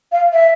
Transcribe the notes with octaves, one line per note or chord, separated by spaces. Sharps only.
F5
E5